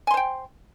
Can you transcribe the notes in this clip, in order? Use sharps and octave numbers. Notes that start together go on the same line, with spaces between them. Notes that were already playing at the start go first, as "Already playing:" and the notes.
C5 G5 G#5 C6